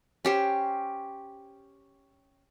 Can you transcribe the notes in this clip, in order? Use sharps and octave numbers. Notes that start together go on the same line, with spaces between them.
C#4 G4 C5